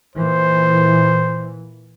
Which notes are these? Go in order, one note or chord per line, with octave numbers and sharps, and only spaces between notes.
A#2 E3 C5